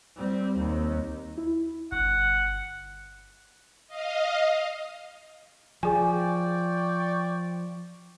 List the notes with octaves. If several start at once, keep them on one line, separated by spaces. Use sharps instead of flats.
G3 C4
D#2
E4
G1 F#5
D#5 F5
F3 G#4 D5 G5 G#5 C#6